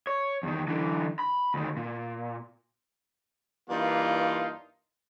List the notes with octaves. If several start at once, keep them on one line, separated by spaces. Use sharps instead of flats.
C#5
E2 D#3
D3 E3
B5
D2 D#3
A#2
G2 E3 A#3 D4 D#4 F4